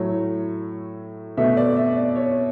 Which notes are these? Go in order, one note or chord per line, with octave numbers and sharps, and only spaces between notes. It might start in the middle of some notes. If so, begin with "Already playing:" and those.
Already playing: A2 F#3 A3 C#5
B2 A3 E5
D5
E5
D5
C#5